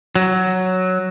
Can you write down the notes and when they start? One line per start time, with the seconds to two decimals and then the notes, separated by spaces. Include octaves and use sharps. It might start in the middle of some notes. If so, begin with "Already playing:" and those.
0.15 F#3